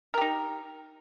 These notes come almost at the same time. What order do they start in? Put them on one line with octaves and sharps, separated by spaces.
A#4 G4 D#4